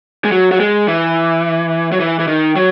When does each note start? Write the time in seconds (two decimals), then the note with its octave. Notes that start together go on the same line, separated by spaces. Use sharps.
0.25 G#3
0.32 F#3
0.51 F#3
0.60 G#3
0.88 E3
1.92 F#3
2.00 E3
2.19 E3
2.28 D#3
2.56 F#3